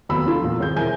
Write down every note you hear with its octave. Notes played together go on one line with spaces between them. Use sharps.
F1 D#2 F#3 B3 B5 E6
D4 F4 A4
E2 A#2
G#1 G#4 G6
E1 E4 A#4 G#5 G6